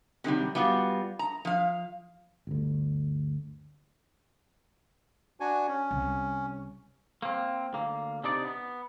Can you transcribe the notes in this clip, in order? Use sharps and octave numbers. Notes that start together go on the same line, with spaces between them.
C3 D#3 F#3 G3
G3 B3 F4 F#4
A#5
F3 F5
G1 D2
D4 F#4 G#5
C#4
C2
A#3 C4
D2 A#3
C3 D4 D#4 D5
B3